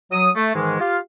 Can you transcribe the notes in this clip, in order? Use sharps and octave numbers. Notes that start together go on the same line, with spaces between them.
F#3 D#6
A3
G#2 D#3 E3 G#3
F4 G4 F5